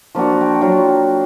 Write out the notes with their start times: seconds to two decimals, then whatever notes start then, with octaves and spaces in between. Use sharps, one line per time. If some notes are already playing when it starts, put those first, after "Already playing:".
0.15 F3 A#3 D4 F#4
0.41 G5
0.61 F#3 F4 F#4